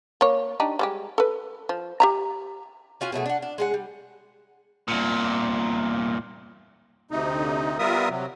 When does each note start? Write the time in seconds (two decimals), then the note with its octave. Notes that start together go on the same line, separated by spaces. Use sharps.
0.21 A#3 C#5
0.60 D4 D#4 G4
0.79 G3 G#3 G4
1.18 A4 B4
1.69 F3
2.00 G4 E5 A#5
3.01 C#4 F4 F#4 G#5
3.12 B2 F#3 A3 G#4
3.26 D4 F#5
3.42 D4
3.58 G#3 G#4 F#5
3.74 G3
4.88 C2 A#2
7.11 D2 C3 D#4
7.79 G3 B3 F4 A#4 E5 D#6
8.10 C3 F#3